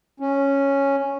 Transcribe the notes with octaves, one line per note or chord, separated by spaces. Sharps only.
C#4